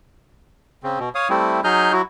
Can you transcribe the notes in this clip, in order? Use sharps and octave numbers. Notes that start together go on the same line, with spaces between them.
C#3 C4
B2
C#5 F5 D#6
G3 A3 C4 E4
F#3 D#4 G#4 D#5 F6 G6
F#3 E4 F#4